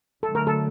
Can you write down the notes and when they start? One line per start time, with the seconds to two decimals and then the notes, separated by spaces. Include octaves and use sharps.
0.23 D3 F#3 A3 A4
0.35 A#4
0.47 A4